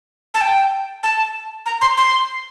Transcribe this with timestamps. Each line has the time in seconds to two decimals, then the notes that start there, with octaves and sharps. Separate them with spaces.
0.34 A5
0.41 G5
1.03 A5
1.66 A#5
1.81 C6
1.97 C6